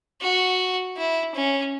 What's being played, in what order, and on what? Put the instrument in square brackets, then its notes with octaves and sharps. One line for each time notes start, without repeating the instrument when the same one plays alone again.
[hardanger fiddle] F#4
E4
C#4